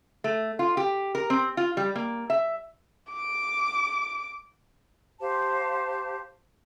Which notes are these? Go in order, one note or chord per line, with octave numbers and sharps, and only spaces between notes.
A3
F4
G4
A#4
C4
F4
G3
A#3
E5
D6
G4 C5 F5 A5